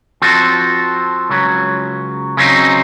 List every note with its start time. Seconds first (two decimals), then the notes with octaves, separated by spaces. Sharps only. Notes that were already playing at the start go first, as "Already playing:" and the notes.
0.22 F3 C4 F#4 A4
1.29 C#2 C#3 F#3
2.37 C#3 F#3 C4 D#4